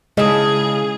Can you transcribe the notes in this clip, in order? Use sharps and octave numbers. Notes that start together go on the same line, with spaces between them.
C#3 G#3 E4 G#4 D#5 A5